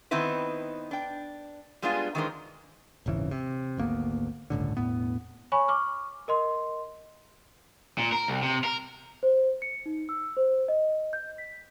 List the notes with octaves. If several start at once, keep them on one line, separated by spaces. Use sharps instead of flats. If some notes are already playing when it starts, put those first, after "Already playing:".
D#3 B3 C4 D#4 E4 B4
D4 G5
G3 G#3 B3 D4 F4 G#4
D#3 E3 G#3 D4 A#4 C5
D#1 G#1 C#3 E3
C3
G#1 D2 A#3 B3
G1 C#2 A2 D3
E1 A2 B3
C#5 G#5 B5 C#6
C#6 D6 F6
A#4 D#5 C6
A#2
A#4
C2
C3
A#4
C5
C#7
D#4
E6
C5
D#5
G6
B6